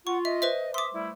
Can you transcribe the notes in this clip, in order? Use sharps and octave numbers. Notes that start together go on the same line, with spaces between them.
F4 F#5 C#6
D#5 E5
B4 C5 E5
E5 C6 D6 D#6
G3 A3 E4